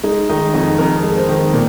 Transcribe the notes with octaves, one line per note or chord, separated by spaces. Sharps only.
G#3 D#4
D#3 D#4
F2 D#4
F2 A#4
G#3
C5
D#3
A#2